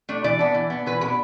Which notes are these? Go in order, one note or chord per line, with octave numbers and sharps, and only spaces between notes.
A3 D4
E3 D5
B3 D4
E3
B3 D4
E3 B4
B3 D4 B4